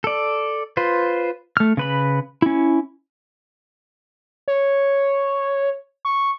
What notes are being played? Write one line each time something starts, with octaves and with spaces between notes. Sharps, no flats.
A4 D5
F4 B4 C5
A3 F6
C#3 B4 B5
C#4 E4
C#5
C#6